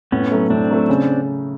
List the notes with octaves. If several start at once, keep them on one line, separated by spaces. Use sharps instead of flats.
A2 B3 C#4
F#3 A3
A2 C4 D4
F#3 A3
C#3